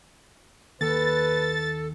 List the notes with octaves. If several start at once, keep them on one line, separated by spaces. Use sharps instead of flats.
D#2 A4 B4 A6